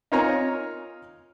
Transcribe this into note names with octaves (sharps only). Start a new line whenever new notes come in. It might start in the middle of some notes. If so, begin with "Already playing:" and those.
D#4 F4 A#4 C#5 G#5 A#5